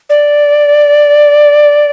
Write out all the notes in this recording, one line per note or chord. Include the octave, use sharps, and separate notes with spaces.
D5